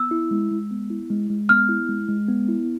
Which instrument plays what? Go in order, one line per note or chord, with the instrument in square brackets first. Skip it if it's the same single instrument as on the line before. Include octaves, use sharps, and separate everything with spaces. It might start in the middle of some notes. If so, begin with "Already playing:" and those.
Already playing: [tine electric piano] B3 [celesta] E6
[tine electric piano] E4
G#3
G#3
B3
E4
G#3
G#3
[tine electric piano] B3 [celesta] F6
[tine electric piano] E4
G#3
G#3
B3
E4